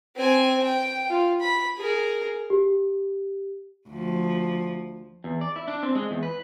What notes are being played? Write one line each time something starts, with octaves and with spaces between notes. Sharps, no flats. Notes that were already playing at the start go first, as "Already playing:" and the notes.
C4 G#5
G5
F4
B5
G#4 A#4
G4
D2 F3
E2
D5
E4
D4
C4
G#3
E2
B4